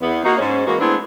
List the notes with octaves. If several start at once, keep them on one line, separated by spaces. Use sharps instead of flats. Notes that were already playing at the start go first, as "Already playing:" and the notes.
E2 B3
A#3 D#4 F#4
G#2 C#4
E3 G#3 A#3 B3 F#4
G#3 A3 B3 C4 D4 E4